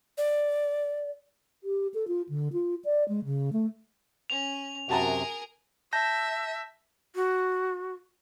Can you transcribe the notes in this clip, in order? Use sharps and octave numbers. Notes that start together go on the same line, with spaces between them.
D5
G4
A4
F4
D3
F4
D5
G#3
C#3
A3
C#4 F7
F#2 C3 F#4 G#4 A#4 A5 A#5
E5 A5 G6 A#6
F#4